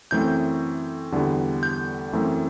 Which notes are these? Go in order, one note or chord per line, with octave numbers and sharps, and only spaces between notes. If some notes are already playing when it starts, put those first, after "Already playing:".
F#2 E3 A3 C4 G6
E2 D3 G3 B3
G6
F#2 E3 A3 C4